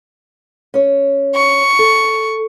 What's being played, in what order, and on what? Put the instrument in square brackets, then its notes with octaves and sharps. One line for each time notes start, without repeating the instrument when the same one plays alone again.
[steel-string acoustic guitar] C#4 C#5
[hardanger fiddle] C#6
[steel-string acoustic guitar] A4